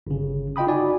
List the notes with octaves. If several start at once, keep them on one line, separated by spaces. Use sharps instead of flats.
G1 C#3
F4 D#5 G5 B5 D#6
D#4 F#4 D5 G#5